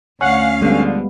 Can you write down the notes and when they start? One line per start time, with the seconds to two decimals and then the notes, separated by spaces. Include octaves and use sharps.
0.21 D2 C#4 F5 F#5
0.61 D3 F3 G3 G#3 B3